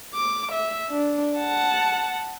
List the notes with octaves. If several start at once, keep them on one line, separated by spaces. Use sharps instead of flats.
D6
E5
D4
F#5 A5